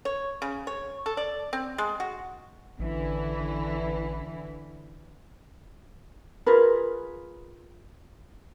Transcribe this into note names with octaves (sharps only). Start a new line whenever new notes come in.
C#5
C#3
C#5
A4
D5
C4
G#3
F#4
A1 D3 E3 E4
F4 G#4 A#4 B4